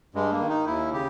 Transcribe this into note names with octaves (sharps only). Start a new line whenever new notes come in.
G2 G#3
A#3
D#3
D#4
D#2 E4
C#3 G4